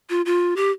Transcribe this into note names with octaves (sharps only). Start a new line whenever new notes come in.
F4
F4
G4